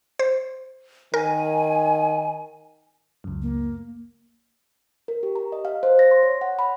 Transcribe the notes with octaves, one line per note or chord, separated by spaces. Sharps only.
C5
D#3 A#4 G#5
C#2 F#2
A#3
A#4
G4
A#5
D#5
F5
C5
A#6
C6
C#5
F#5
B5